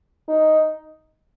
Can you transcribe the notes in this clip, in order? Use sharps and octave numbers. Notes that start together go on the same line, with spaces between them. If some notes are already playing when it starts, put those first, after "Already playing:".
D#4